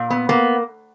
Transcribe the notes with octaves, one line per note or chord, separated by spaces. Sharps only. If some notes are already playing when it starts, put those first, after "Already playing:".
Already playing: A#2
B3
A#3 B3